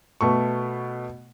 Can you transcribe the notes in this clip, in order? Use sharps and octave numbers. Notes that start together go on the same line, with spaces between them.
B2 A3 C#6